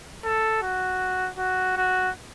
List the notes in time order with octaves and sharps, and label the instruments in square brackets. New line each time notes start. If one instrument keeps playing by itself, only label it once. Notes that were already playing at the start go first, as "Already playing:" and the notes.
[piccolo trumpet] A4
F#4
F#4
F#4